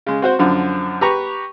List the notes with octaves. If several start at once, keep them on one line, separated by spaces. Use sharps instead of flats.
C#3 G#3
C4 F#4 C5
F#2 D3 F3
G4 B4 A#5 C#6